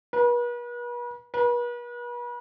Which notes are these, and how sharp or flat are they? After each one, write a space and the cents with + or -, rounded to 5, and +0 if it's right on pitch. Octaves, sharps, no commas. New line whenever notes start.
B4 -40
B4 -40